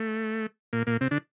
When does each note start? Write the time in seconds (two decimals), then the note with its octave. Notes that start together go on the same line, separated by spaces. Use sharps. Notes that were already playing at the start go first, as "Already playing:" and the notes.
Already playing: A3
0.73 A#2 A#3
0.87 A#2 A#3
1.01 C3 C4
1.11 D3 D4